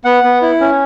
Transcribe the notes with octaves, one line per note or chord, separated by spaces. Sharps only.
B3 F#5
B3
E4
C#4